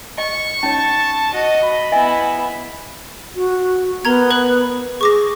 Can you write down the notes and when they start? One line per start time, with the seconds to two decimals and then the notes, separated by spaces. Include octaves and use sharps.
0.18 D#5 C#6
0.63 C#4 D#4 C#5 A5
1.33 F#4 D#5
1.63 B5
1.92 B3 E4 D#5 E5 G#5
3.36 F#4
4.05 B3 A#4 A#5 G#6
4.31 B4 F#6 F#7
5.01 G#4 C#6 D6 A#6